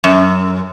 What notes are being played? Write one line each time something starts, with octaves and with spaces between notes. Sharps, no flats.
F#2